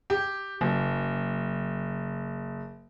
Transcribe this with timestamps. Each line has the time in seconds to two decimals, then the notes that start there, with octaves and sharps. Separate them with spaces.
0.10 G4
0.61 F#1